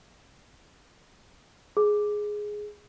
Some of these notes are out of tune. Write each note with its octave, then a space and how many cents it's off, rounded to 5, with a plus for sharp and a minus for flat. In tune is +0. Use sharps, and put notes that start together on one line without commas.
G#4 +5